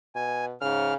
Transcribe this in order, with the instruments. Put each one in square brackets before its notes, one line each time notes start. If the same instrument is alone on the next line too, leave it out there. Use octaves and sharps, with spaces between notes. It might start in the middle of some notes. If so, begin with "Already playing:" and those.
[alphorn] B2 [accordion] G#5
[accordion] G#2 F6 [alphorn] C#3